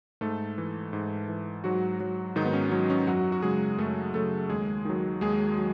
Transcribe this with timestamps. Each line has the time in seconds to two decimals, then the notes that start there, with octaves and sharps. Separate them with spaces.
0.21 G#2 A3 A4
0.58 E3
0.93 G#2
1.28 E3
1.64 G#2 F#3 F#4
2.00 F#3
2.36 G#2 D#3 D#4
2.46 B3
2.53 C#4
2.71 F#3 C#4
2.90 C#4
3.07 F#2 F#3 F#4
3.32 F#4
3.42 C#3 F#3 G#3 G#4
3.78 F#2 A3 A4
4.14 C#3 F#3 A3 A4
4.50 D#2 G#3 G#4
4.85 D#3 F#3
5.21 D#2 G#3 G#4
5.58 F#3